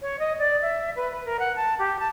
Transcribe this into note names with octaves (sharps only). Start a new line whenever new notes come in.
C#5
D#5
D5
E5
B4
B4
A#4
F#5
A5
G4
A5